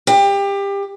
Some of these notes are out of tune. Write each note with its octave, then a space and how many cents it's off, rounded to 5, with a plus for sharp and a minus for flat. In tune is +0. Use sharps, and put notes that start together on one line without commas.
G4 +25